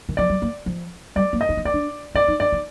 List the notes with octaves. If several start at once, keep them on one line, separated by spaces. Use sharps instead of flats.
D#3
F3 D5
G3
A#3
F3
G3 D5
A#3
D#5
D#4
D4
C4 D5
D4
D#4 D5
D#4
D4 D5
D#4